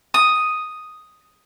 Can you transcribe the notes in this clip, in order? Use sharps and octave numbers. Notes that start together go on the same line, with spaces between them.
D#6